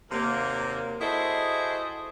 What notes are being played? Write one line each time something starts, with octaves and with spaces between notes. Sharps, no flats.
D#2 C3 F#3 A#3
E4 F#4 G#4 A4 C5 D#5